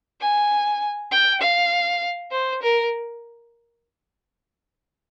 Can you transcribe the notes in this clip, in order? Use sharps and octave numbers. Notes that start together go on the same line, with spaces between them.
G#5
G5
F5
C5
A#4